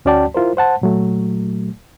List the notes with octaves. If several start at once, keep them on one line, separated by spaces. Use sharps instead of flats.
D2 C#4 F#4 D5 G5 A5
E4 F4 A#4 C5
C5 F#5 A5
A#2 F#3 A3